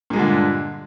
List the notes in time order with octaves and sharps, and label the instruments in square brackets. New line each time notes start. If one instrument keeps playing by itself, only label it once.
[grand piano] A#2
G#3
G2
D3